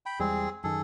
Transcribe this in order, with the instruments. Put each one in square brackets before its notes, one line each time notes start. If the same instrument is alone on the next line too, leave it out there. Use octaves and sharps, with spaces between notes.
[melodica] G5 B5
[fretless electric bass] E2 G3 G#3 [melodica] C4 G#4
[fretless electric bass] F#2 D#3 [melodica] G#4 A4